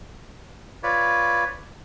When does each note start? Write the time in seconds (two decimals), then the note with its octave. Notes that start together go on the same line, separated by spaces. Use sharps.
0.83 F4 B4 C#5 D5